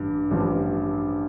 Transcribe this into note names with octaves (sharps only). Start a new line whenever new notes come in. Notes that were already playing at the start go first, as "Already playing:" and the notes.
Already playing: A1 G2
A1 G2 F3